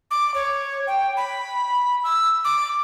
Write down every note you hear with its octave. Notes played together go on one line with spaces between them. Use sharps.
D6
C#5
G5
B5
E6
D6